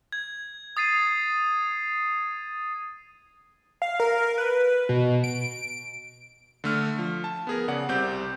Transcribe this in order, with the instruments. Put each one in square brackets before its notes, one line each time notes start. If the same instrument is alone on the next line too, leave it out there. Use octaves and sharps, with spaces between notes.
[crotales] G#6
D#6 A6 C7 D#7
[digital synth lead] F5
A#4
B4
B2
D7
[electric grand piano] D3 A3 F6
F3
A5
B3 G#4 A#4
C#3 D5 F#5
C2 C4 G4 G6